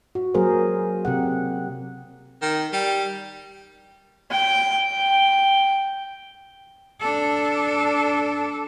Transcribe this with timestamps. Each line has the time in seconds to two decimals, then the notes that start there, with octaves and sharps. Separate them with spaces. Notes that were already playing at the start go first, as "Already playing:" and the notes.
0.15 F#4
0.34 F#3 A#3 G#4 A#4 C5
1.05 C3 G4 F#5
2.42 D#3
2.73 G3
4.31 G5
4.92 G5
7.00 D4 A4